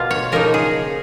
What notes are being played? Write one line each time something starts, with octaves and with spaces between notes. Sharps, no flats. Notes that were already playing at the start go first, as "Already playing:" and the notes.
Already playing: B2 A#3 F4 F5
C#5
C#3 F3 A#3 D#4 A#4
G#4